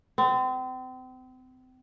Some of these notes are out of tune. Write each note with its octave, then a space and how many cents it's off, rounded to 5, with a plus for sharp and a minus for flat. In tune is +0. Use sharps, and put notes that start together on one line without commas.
C4 -35